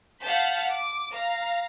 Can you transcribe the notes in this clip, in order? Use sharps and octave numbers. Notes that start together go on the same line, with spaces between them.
F5 F#5 A5 G6 B6
D6
F5 A#5